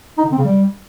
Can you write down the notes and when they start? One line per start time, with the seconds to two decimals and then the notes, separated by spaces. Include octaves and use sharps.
0.18 D#4
0.25 D3
0.31 C4
0.38 C#3
0.45 G3